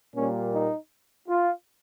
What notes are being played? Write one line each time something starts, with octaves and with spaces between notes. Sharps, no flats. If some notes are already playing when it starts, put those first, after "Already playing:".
A#2 G3 A#3 C#4
D#4
F4